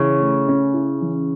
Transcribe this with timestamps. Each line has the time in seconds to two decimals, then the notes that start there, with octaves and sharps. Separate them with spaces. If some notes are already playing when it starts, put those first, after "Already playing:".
Already playing: C#3 E3 E4
0.20 A3
0.48 C#4
0.74 E4
1.01 E3